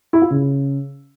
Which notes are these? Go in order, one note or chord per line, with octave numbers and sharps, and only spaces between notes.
E4
F4
C#3